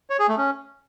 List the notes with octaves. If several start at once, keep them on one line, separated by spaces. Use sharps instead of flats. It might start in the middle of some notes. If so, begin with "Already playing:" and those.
C#5
G#4
A3
C#4